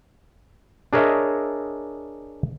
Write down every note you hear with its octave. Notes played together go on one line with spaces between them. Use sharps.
D4 G#4 A#4 C#5 D#5 E5